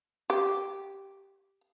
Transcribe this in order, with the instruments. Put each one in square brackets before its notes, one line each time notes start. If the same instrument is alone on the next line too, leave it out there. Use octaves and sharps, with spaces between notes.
[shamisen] G4